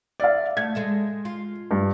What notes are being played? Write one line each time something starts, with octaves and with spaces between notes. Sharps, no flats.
D5 E5 F5
A3 G#6
G#3 A4 E5
F4
G2